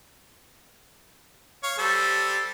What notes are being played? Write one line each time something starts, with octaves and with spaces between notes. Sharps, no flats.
C#5 F5
G3 A4 C5 E6